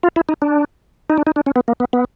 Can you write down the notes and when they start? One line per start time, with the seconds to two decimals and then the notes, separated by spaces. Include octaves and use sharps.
0.03 F4
0.16 E4
0.29 D#4
0.42 D4
1.10 D#4
1.18 D4
1.27 D#4
1.36 D4
1.46 C#4
1.56 B3
1.68 A#3
1.80 B3
1.93 B3